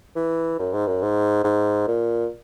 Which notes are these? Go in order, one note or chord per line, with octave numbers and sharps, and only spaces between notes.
E3
F#2
G#2
F#2
G#2
G#2
A#2